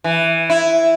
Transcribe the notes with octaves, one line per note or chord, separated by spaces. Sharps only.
E3
E4